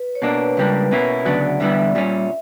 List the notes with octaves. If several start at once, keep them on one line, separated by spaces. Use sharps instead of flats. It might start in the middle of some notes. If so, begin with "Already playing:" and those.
Already playing: B4
C#5
B2 A#3 D4 B4
C#2 C#3 G3 A#3 D4 B4
B2 A#3 C#4 E4
D2 C#3 F#3 B3 D4 D5
E2 D3 G3 B3 E4 E5
A#2 G3 C#4 E5